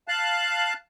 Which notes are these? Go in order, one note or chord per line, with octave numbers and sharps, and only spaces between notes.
F5 A5 F#6